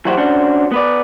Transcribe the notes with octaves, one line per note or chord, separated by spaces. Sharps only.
E3 F#3 E4 F#4 G4 C5
C#4 D4 F#4 C5
B3 B4 D5